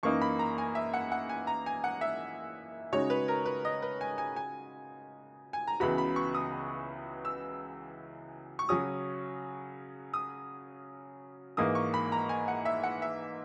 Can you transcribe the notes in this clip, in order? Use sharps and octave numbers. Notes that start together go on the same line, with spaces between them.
F#2 E3 A#3 D#4 C#6
B5
A#5
G#5
E5
F#5
F#5
G#5
A#5
G#5
F#5
E5
C#3 G#3 D#4 F#4 C#5
B4
A#4
B4
D#5
B4
G#5
G#5
G#5
G#5
A#5
C#2 C#3 E3 B3 F#4 B5
B5
C#6
D#6
E6
C#6
C#3 F#3 C#4 F#4 D#6
D#6
G#2 E3 A#3 D#6
C#6
B5
A#5
G#5
F#5
E5
F#5
E5